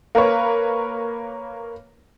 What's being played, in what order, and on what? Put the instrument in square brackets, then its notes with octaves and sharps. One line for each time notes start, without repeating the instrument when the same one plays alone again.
[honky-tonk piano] A#3 A#4 B4 C#5